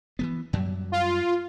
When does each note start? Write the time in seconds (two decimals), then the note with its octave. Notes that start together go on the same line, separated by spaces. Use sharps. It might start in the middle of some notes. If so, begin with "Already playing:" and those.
0.19 E3 F3 B3
0.53 F#2 F#3 G3
0.92 F4